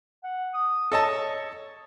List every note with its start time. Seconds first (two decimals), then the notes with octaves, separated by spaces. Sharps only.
0.23 F#5
0.54 D#6
0.92 A4 C#5 D#5 A5